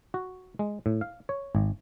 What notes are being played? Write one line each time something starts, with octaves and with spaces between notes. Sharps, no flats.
F#4
G#3
A2
F5
C#5
G#1